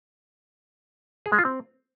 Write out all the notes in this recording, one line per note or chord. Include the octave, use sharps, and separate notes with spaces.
G#4
G#3
F4
C4